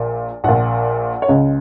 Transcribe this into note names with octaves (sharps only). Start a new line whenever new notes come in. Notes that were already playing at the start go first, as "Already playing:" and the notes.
Already playing: A#1 A#2
A#1 A#2 F#5
C#5
C#2 C#3 D#5